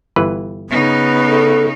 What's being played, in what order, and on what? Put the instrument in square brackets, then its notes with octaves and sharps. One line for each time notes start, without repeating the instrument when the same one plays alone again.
[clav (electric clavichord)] G1 E3 B4
[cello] C#3 D#4 [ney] B3
[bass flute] A4